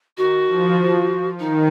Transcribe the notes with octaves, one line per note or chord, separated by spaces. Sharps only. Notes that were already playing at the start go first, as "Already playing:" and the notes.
D#3 F#4
F3
D#3 D#4